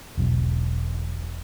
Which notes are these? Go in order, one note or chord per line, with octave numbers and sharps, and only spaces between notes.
E1 B1